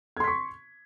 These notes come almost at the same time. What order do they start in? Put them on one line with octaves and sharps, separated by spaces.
G#6 C6 B6 C#6